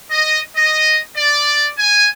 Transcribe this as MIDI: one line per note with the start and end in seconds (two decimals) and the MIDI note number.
0.11 0.39 75
0.56 0.97 75
1.16 1.70 74
1.78 2.08 80